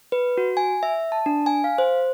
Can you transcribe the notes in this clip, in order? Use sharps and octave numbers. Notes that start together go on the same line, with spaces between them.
B4
F#4
G#5
E5
A5
D4
G#5
F5
C5